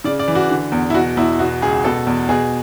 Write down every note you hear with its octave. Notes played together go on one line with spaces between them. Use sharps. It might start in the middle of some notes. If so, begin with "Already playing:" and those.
C#3 D5
D5
E3
F#4
D3
E2
E4
B2 F#4
E2 E4
B2 F#4
C#2 G#4
B2 A4
E2
B2 G#4